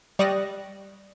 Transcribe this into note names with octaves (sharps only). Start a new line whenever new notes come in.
G3 D5 C#6 D#6 F#6 A#6